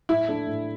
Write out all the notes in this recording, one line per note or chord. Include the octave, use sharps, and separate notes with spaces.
A2 E4
A3 D4
A2